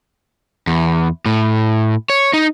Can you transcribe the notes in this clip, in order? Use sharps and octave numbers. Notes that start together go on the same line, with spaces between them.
E2
A2
C#5
D#4